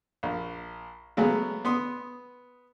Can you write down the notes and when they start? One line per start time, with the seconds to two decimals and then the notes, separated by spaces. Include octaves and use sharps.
0.23 A#1
1.17 C#3 F#3 G#3 A3 B3
1.65 B3 C6 D#6